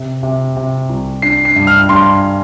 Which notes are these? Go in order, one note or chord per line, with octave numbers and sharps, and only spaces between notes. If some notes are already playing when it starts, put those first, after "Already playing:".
Already playing: C3
C3
C3
C2
D4 C7
C7
G2
F6
G2 C6